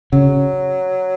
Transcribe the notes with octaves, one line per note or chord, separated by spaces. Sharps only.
C#3 F#3